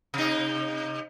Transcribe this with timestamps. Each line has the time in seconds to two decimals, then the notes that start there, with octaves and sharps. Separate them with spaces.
0.14 C3 D#4